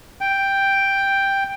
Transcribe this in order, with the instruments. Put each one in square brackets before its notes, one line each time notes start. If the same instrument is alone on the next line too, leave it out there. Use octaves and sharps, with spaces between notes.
[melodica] G5